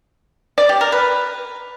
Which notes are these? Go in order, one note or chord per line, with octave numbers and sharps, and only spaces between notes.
D5
G4
A#4
B4